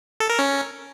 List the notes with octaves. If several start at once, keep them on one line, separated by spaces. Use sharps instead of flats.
A4
A#4
C#4